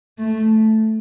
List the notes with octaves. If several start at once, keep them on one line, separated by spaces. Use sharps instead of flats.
A3